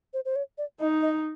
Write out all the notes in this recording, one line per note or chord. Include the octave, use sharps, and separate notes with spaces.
C5
C5
C#5
D5
D#4 D#5
D#5